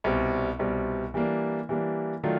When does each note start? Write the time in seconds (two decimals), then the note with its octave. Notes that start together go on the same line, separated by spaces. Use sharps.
0.04 C2 B2 G3 C4
0.59 C2 B2 G3 C4
1.14 E3 G3 A#3 D4
1.69 E3 G3 A#3 D4
2.24 D#3 F#3 A3 D4 F4